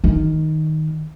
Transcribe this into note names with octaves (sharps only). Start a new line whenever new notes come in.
D#3